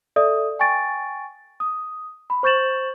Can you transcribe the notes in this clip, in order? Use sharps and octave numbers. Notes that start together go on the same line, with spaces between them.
A4 D5 E5 D#6
G5 G#5 C#6 A6 D7
D#6
B5
C5 C#6 G6 A6 E7 F#7